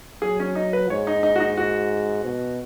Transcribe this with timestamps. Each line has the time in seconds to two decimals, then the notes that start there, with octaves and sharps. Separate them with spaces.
0.22 F#3 G#4
0.40 C#4
0.55 D#4
0.73 B4
0.89 G#2 C#5
1.07 D#4
1.23 D#4
1.36 F#4
1.40 D#4
1.57 F#4
2.24 B2